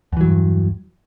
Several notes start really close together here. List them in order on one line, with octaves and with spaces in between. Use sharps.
E2 E3 F#3 G2